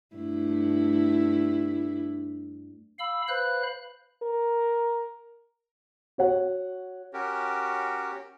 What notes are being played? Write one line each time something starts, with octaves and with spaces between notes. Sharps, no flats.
G2 A3 E4
F5 B5 E6
B4 C5 F5 B5 F#6
A#4
F#4 C#5 F#5
C#4 F#4 G4 A#4